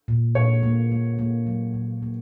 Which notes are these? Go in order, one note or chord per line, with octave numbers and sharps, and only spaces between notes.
A#2
A#2 C#5
A#3
A#3
A#3
F#3
A#2
A#3